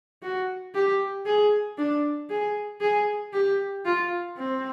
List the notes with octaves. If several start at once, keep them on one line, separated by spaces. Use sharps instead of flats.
F#4
G4
G#4
D4
G#4
G#4
G4
F4
C4